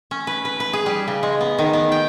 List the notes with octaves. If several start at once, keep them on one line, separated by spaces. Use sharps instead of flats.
C#4
B4
B4
B4
G#4
G3
C#3
G#3
B3
D#3
B3
G5